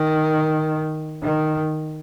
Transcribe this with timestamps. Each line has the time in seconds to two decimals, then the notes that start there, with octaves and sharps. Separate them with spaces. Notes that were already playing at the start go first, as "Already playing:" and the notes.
Already playing: D#3
1.22 D#3